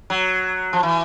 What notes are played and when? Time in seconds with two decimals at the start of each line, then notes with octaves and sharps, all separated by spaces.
0.10 F#3
0.73 F3
0.83 E3